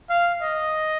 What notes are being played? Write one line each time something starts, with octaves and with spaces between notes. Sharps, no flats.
F5
D#5